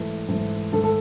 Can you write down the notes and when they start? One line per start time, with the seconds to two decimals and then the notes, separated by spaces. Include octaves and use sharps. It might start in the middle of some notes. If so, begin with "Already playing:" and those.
Already playing: G#2 E3 A3 B4
0.28 G#2 E3 A3
0.73 G#2 D#3 A3 A4
0.84 A4